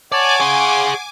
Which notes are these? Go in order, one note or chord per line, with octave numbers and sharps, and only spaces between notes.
C#5 D5 F#5 G#5 A5 D6
G#4 C#5 C6